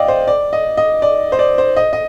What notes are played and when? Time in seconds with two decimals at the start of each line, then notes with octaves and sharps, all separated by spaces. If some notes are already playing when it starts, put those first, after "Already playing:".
Already playing: D5 D#5 F5 G5
0.08 C5
0.28 D5
0.53 D#5
0.77 D#5
1.02 D5
1.32 C5
1.39 D5
1.58 C5
1.76 D#5
1.93 D#5